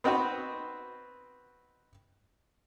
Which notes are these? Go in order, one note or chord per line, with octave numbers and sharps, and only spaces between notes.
B3 C4 D#4 F#4 B4